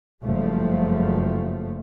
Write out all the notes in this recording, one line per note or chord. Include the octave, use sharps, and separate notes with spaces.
F#1 G2 F3 A3